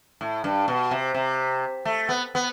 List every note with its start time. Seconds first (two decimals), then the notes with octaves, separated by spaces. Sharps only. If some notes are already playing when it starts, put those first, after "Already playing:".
0.21 A2
0.44 G2
0.68 B2
0.91 C3
1.14 C3
1.85 A3
2.09 B3
2.35 B3